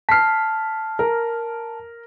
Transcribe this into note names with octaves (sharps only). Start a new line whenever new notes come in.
A5 F6 B6 C7
A#4